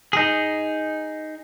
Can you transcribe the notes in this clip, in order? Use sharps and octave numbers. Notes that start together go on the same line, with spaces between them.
D#4 G#4